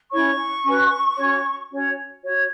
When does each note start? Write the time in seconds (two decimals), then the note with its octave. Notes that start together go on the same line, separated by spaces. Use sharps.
0.11 C#4 E4 C#5 C#6
0.64 C#4 F#4 B4
1.17 C#4 F#4 C#5
1.69 C#4 F#4 C#5
2.22 F#4 C#5